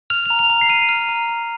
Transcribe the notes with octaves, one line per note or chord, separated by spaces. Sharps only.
F6 F7
F7
A#5
F7
A#5
C7
F6 D#7
F6
A#5
A#5